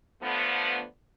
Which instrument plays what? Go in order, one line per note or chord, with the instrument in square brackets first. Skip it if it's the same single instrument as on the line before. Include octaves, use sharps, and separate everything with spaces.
[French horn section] D3 F3 A3 B3